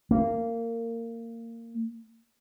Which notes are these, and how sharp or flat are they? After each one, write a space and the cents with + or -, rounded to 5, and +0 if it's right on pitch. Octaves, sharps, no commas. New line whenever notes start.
A#3 -20